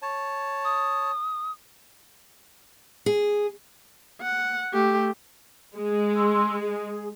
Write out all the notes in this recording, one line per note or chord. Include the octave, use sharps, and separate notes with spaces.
C#5 A5
D#6
G#4
F#5
A3 G4
G#3
C6 E6
G#4